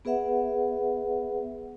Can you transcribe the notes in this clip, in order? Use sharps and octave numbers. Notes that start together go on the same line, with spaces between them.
B3 G#4 B4 E5 F#5